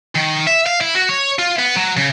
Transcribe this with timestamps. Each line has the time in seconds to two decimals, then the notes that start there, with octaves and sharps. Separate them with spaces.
0.16 D#3
0.47 E5
0.66 F5
0.81 E4
0.95 F#4
1.09 C#5
1.39 F4
1.59 B3
1.76 F#3
1.97 C#3